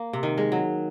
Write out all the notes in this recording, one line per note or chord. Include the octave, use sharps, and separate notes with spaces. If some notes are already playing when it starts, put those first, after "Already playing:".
Already playing: A#3
C3
D#3
G#3
F#3